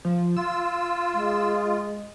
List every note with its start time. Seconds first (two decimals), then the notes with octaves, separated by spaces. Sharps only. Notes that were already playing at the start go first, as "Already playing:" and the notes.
0.05 F3
0.37 F4 E6
1.14 G#3